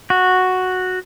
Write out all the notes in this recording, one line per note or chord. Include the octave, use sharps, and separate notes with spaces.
F#4